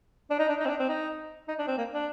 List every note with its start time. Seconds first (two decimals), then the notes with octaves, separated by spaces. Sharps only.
0.30 D4
0.39 D#4
0.49 D4
0.60 D#4
0.65 C4
0.70 D4
0.79 C4
0.89 D#4
1.48 D#4
1.59 D4
1.68 C4
1.78 A#3
1.93 D4